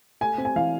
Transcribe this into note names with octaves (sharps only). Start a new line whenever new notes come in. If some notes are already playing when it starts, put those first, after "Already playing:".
A3 G#5
C4
G#5
E3 F5